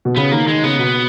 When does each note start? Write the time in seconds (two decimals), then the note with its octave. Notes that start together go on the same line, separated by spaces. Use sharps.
0.05 B2
0.16 C#3 B3
0.32 D#3 A#3
0.47 D#3 G#3
0.64 C#3 B3
0.79 B2